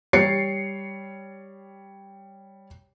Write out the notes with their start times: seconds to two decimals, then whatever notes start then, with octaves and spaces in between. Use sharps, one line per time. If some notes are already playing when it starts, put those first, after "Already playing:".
0.13 G3 C#5 A6 C7 C#7